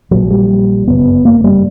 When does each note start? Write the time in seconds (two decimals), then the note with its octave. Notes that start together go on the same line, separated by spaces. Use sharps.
0.11 A#1 A#2 F#3
0.31 G3
0.87 G1 F#2 C#3 B3
1.25 A#3
1.44 G3